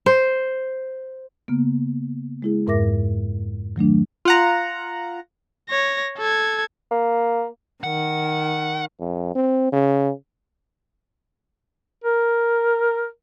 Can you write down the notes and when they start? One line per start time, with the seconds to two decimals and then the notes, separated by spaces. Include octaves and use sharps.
0.06 C5
1.48 C#3 A#3 B3
2.42 G#3 E4 G#4
2.67 F2 G#2 A#4 E5 D6 A#6
3.76 D#3 F#3 A3 D4
4.25 F4 F#5 A#5
5.70 C#5 A#6
6.18 A4 G#6
6.91 A#3
7.84 D#3 F#5
9.00 F2
9.35 C4
9.72 C#3
12.04 A#4